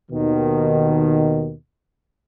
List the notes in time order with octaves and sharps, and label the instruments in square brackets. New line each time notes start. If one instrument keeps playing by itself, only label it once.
[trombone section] D#2 B2 D#3